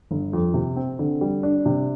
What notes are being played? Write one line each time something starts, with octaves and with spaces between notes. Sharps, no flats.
G1
F2
C3
C4
D3
G3
D4
C3